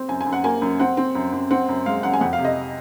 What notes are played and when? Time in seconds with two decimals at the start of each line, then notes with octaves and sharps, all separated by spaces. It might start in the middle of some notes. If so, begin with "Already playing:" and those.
Already playing: C4
0.08 F#2 G#5
0.21 G#5
0.26 F#2
0.33 F#5
0.44 A#3 G#5
0.62 F#2
0.80 C4 F#5
0.97 C4
1.15 F#2
1.33 F#2
1.51 C4 F#5
1.69 F#2
1.86 G#3 F5
2.03 F#2 F#5
2.14 G#5
2.21 F2 F#5
2.33 F5
2.39 C3
2.45 D#5